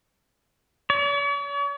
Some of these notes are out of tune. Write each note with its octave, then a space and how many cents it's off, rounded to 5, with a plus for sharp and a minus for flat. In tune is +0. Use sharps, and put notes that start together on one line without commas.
C#5 +45